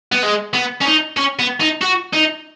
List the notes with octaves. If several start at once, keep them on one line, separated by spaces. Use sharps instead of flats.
B3
G#3
B3
C#4
D#4
C#4
B3
D#4
F#4
D#4